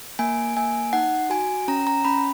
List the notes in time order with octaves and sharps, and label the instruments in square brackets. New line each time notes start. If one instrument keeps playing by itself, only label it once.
[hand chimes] A#3 G#5
A#3 G#5
D#4 F#5
F#4 G#5
C#4 A#5
A#5
C#4 B5